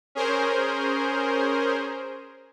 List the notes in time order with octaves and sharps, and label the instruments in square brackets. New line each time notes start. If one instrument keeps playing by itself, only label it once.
[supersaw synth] C#4 G#4 A#4 C5